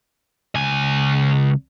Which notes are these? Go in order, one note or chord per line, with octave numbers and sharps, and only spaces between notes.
C#2 G#5